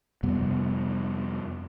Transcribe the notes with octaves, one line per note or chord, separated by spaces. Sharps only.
F2 C3 G3 B3